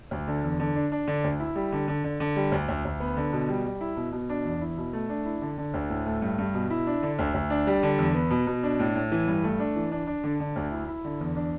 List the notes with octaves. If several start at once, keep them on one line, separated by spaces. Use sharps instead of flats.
D2
D3
E2
D3
D4
D4
D3
D2
E4
G3
D3
D3
D3
D3
G3
D2
D2
D2
B3
D3
B2
G3
G3
E4
B2
B2
D4
E2
E4
B2
A3
D4
E4
D3
D3
D2
A2
A3
G2
G2
B2
E4
D4
D3
D2
D2
D4
G3
D3
E2
B3
B2
B2
D4
A2
A2
E3
G2
A3
D4
E3
D4
D4
D3
D3
D2
E4
E4
D3
E2
D4